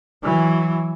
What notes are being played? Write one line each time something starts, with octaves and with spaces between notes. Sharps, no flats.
E3 F#3